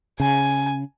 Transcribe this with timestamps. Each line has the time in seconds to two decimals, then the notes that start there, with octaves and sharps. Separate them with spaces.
0.20 C#3 G#5